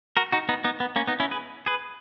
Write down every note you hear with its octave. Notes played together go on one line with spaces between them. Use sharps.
F#4 A#4
D#4 F#4
B3 D#4
B3 D#4
B3
A#3 C#4
B3 D#4
C#4 E4
G#4 B4
G#4 B4